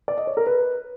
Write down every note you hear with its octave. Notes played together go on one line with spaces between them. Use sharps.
D5
D#5
C#5
A#4
B4